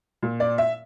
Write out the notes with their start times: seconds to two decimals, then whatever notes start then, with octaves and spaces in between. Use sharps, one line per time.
0.23 A#2
0.40 D5
0.58 E5